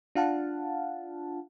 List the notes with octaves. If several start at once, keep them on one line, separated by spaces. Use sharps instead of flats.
D4 F4 F5 F#5 A5